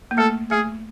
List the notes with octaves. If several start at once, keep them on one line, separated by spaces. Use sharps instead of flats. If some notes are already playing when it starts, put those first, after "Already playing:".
A#3
A3 A4
A3 G#4